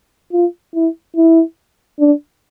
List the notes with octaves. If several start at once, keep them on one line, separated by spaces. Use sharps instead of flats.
F4
E4
E4
D4